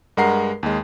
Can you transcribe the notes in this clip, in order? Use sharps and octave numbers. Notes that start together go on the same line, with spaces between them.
G2 G#3 A#4 F#5 A#5 C7
D#2 G#3